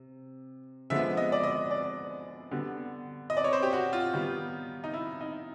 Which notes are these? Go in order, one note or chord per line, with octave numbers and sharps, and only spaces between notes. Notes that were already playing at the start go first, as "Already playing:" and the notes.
Already playing: C3
D3 F3 G#3 B3 E5
D#5
D5
D#5
D5
D3 G3 B3
D#5
D5
C#5
C5
G4
F#4
F4
D#3 G3 B3
D#4
E4
D#4